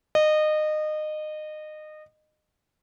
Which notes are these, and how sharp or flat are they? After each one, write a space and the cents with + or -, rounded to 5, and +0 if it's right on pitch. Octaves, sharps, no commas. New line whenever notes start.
D#5 -25